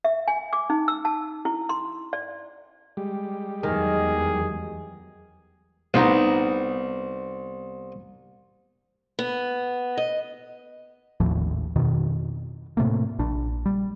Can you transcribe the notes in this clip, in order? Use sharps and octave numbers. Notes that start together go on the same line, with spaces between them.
E5
G#5
D6
D#4
E6
A5
E4
C6
D5
G3 G#3 G4
E2 D#3 F#3 G#4
C2 B3 D#4
B3
D#5
G#1 D#2 A2 F3
F2 B2 D#3
A2 C3 A3 A#3
A#1 D4
G3